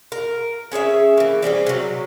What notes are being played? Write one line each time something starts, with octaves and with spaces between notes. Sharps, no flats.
A#4
C#4 G#4 C#5 E5
E3 A#3
G3 C4 C#4 G#4
C3 F#3